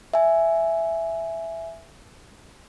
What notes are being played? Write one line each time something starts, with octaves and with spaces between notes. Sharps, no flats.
E5 G#5